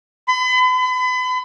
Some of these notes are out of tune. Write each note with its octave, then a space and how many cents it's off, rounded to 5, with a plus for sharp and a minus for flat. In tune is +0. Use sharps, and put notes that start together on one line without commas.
B5 +40
B5 +35